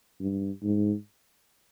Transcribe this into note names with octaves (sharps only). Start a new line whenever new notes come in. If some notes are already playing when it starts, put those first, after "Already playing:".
G2
G#2